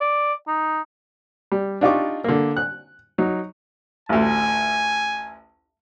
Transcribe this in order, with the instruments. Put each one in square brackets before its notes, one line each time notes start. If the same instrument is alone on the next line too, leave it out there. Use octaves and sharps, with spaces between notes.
[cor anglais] D5
D#4
[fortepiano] G3
D4 D#4 F4 G4 C#6 D6
D3 A#3
F#6
F#3 D#4
[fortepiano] A1 D2 [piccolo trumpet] G#5